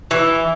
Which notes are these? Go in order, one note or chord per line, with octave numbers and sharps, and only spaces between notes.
E3